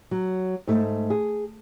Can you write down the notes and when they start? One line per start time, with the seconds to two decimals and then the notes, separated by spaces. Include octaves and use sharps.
0.11 F#3
0.67 G#2 A3
1.10 G#4